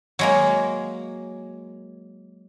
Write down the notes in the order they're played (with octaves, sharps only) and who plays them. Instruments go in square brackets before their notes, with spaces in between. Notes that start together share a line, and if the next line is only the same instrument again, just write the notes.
[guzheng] F#3 G#3 A#3